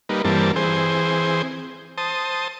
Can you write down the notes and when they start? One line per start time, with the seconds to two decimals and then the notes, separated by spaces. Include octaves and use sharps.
0.09 G3 A#3 D#4 B4
0.24 G2 E3 G3 A#3 C4 A5
0.56 E3 C4 G#4 C5
1.98 C5 A5 D#6